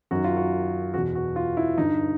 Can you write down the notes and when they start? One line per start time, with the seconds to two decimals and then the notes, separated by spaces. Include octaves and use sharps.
0.11 F#2 D#3 F#4
0.24 F4
0.37 F#4
0.94 E2 B2 F#4
1.15 F#4
1.36 F4
1.57 E4
1.77 G2 D3 D#4